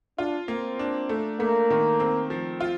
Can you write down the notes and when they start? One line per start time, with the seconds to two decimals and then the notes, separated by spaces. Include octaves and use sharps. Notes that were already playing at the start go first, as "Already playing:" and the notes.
0.18 D4 F4
0.48 A#3 C4
0.79 D4
1.09 A3
1.40 A3 A#3
1.70 D#3
2.00 C4
2.30 F3
2.61 F4